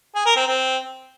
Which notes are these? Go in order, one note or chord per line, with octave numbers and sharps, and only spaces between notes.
G#4
A#4
C4
C4